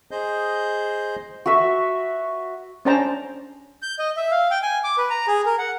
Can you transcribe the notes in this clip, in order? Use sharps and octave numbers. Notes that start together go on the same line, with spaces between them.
G#4 C5 D#5 G6
F#4 B4 E5 C#6
C#4 D4 C5 G5 A5 A#5
G6
D#5
E5
F5
G5
G#5
D6
B4
A#5
G#4
A#4
F#5